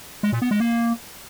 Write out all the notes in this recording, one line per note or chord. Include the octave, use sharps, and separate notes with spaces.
G#3
A#2
B3
G#3
A#3